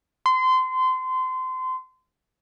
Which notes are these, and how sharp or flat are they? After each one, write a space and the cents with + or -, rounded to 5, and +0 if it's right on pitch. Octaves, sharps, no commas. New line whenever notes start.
C6 -25